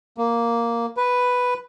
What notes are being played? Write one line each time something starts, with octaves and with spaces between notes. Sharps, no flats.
A#3
B4